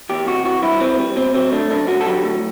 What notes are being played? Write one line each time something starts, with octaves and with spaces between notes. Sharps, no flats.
E2 G4
C3 F#4
E3 F#4
G2 E4
E3 C4
G3
B2 C4
F#3 C4
A3 D4
F#2 D4
D3 F#4
A4
F#3 G4
A2